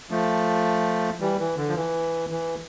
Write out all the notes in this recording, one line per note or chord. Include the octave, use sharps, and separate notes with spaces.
F3 A3
E3 G3
E3
D3
F3
E3
E3